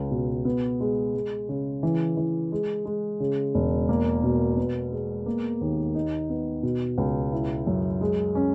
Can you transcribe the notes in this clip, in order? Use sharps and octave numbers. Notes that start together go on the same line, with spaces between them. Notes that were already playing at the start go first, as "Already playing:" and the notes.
Already playing: C#2
B2
B3
G#3
G#3
C#3
E3
E3
G#3
G#3
C#3
E1
A#3
B2
B3
G#3
A#3
D#2
D#4
B3
B2
C#2
E4
F#2
G#3
C#4